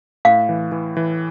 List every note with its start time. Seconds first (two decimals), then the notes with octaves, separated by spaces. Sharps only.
0.25 A2 F5
0.49 E3
0.72 E3
0.97 E3